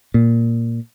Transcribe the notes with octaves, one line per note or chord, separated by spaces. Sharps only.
A#2